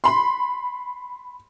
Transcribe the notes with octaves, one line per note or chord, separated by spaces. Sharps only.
B5 C6